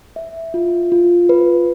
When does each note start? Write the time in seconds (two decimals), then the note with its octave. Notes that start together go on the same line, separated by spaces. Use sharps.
0.16 E5
0.54 F4
0.92 F4
1.29 B4